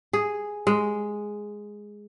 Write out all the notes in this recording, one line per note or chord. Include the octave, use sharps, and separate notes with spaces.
G#4
G#3